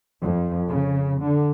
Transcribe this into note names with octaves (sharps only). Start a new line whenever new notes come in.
F2
C#3
D3